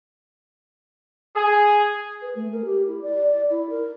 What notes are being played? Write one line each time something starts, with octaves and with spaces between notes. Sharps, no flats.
G#4
B4
A3
A#4
G4
E4
D5
E4
A#4